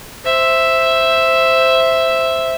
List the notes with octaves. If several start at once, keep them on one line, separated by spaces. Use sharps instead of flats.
C5 E5